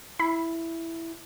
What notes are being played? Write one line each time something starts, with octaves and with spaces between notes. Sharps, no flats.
E4 B5